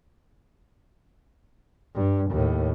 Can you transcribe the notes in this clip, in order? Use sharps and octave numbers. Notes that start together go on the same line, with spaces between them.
G2
D#2 A2